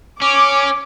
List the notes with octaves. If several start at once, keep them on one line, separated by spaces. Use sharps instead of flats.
C#4 D6